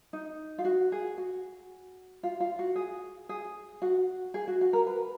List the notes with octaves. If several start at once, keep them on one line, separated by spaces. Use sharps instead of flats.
D#4
F4
F#4
G#4
F#4
F4
F4
F#4
G#4
G#4
F#4
G#4
F#4
F#4
A#4
B4